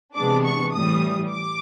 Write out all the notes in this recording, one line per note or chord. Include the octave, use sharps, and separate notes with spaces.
C3 E3 G#3 B3 D4 D6
C#6
A2 E3 G3 D#6
D6